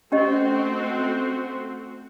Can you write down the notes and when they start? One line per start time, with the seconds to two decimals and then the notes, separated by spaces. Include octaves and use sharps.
0.12 A3 C4 C#4 F#4 G4 D#5